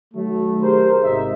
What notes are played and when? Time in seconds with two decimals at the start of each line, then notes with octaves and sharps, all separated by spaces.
0.14 D#3 F#3 A3
0.62 G4 G#4 A#4 C5
1.03 G#1 C3 D#4 E5